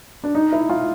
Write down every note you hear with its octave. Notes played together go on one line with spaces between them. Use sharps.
D4
D#4
E4
F4